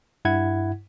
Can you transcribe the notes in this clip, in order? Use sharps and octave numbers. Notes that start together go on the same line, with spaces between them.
G2 E4 F#5 G#6